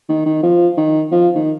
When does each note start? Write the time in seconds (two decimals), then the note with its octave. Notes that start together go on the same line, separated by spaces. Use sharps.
0.09 D#3
0.26 D#3
0.43 F3
0.77 D#3
1.12 F3
1.35 D#3